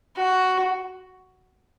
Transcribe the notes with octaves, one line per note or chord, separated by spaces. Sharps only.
F#4